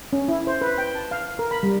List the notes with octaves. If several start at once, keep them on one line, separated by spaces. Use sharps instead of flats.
C#4
E4
C5
B4
G5
A5
F5
A#4
B5
G3